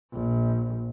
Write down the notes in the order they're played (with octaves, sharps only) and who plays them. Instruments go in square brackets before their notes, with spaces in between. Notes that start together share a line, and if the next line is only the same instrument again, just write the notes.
[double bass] A#1